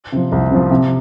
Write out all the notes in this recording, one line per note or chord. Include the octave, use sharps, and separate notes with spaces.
C3 F3
C2
C3 F3
C3